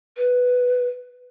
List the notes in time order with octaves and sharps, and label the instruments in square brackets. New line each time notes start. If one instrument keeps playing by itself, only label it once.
[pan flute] B4